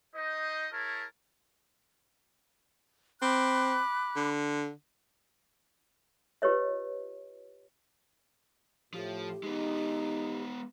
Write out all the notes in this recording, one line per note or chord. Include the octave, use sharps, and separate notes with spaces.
D#4 C5 D#5
E4 G#4 A#4 C#5 A5
C4 B5 D6 F#6
D3
F4 G4 B4 C#5 D#5
A2 F3 G4
G#3 B3 D#4